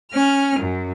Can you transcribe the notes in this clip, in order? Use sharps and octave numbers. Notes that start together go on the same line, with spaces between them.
C#4 F6
F#2